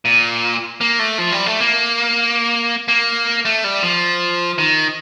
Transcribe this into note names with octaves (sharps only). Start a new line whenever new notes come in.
A#2
A#3
A3
F3
G3
A3
A#3
A#3
A3
G3
F3
D#3